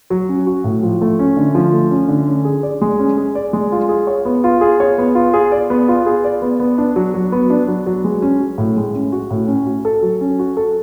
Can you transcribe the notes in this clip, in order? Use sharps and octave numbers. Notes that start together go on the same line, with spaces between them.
F#3
C#4
F#4
A2
F3
A3
C#4
D3
F3
A3
C#4
D3
C#4
G#4
D5
G#3
C#4
G#4
D5
G#3
F4
G#4
C#5
B3
F4
G#4
C#5
B3
F4
G#4
D5
B3
F4
G#4
D5
B3
B3
D4
F#3
F#3
B3
D4
F#3
F#3
G#3
C#4
F#4
A2
G#3
C#4
F#4
A2
C#4
F#4
A4
F#3
C#4
F#4
A4